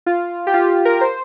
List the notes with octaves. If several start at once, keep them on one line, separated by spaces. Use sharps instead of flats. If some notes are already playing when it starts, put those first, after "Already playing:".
F4
G4
F4
G4
A#4
C5